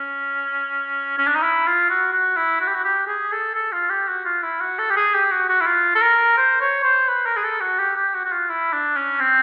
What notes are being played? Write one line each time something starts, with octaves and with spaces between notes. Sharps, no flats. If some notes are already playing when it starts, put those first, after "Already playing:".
Already playing: C#4
C#4
D4
D#4
E4
F4
F#4
F#4
E4
F#4
G4
F#4
G4
G#4
A4
A4
F4
G4
F#4
F4
E4
F#4
A4
G4
G#4
G4
F#4
F#4
E4
F4
A4
A#4
C5
C#5
C5
B4
A#4
G#4
A4
F#4
G4
G4
F#4
F#4
F4
E4
D4
C#4
C4